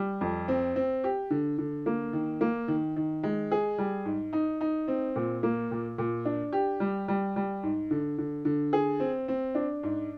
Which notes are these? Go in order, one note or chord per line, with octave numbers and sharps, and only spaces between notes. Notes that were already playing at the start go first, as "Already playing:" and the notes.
Already playing: G3
F2
C4
C4
G4
D3
D3
A#3
D#3
A#3
D#3
D#3
G#3
G#4
G3
G#2
D#4
D#4
C4
A#2
A#3
A#2
A#2
D4
G4
G3
G3
G3
G#2
D3
D3
D3
G#4
C4
C4
D4
G#2